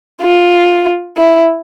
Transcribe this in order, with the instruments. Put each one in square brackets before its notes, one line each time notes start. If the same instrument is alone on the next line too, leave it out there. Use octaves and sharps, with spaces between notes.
[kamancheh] F4
E4